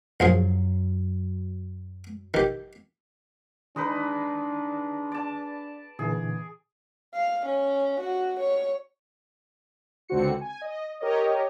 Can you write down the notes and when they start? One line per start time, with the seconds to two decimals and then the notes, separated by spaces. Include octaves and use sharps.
0.20 A#1 F#2 F3 F#3 G#4
2.34 D#3 G4
3.76 D#3 G#3 D4 D#4 B4 B5
5.12 D5 A5
5.99 A#2 D3 E3 G#4
7.14 F5
7.46 C#4
8.01 F#4
8.40 C#5
10.08 C#2 D3 C4 F#4 C#7
10.41 G#5
10.62 D#5
11.01 G4 A#4 C#5 D#5